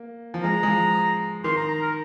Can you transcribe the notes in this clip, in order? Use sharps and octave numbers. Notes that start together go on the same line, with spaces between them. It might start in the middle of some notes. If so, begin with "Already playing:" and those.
Already playing: A#3
F3
G#3 A#5
G#3
F3
D#3 C6
A#5
A#5
A#4